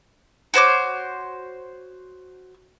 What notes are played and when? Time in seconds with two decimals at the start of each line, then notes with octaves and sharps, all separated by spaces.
0.54 F#4 C5 C#5 D6